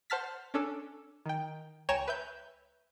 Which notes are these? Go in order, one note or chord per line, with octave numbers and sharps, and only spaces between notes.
C5 F#5 A5 F6 A6 B6
C#4 D4 A4
D#3 G5
C#2 C#5 G5 G#5 A#5 E7
B4 E5 G6